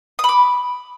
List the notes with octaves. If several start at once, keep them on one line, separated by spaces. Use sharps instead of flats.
B5 D6 D#6